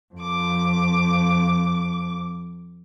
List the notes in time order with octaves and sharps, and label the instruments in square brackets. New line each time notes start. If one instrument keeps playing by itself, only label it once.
[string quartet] F2 D6